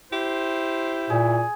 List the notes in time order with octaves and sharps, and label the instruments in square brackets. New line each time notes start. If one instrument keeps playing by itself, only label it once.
[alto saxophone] E4 [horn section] G4 C5
[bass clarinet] A#2 [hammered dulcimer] G#4